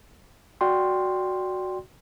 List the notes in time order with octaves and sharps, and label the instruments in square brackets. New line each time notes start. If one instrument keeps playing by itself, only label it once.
[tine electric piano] F#4 D5 G5 C6